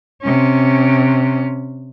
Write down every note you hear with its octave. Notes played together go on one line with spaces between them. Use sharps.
C3 C#4